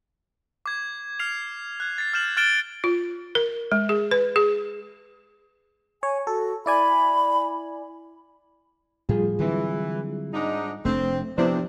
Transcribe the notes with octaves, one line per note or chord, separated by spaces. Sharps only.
D6 G#6
F6 C7 F7
F#6 G#6
A6 C7
F6 G6 E7 F#7
F6 F#6 A6 D7 E7 G7
F4
A#4
G#3
G#4
B4
G#4
C#5 G#5
F#4 A4
E4 D5 G#5 B5
A2 F3 G3 F4 G#4
D3 E3 F#3 C4
G#2 D4 D#4
F1 F2 A3 C4 D4
C3 F3 B3 C4 D4 E4 C5